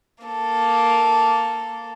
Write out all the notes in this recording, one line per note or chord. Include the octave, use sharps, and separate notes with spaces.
A#3 A4